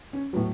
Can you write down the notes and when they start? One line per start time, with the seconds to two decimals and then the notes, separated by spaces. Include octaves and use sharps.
0.13 C#4
0.33 A2 F#3 B3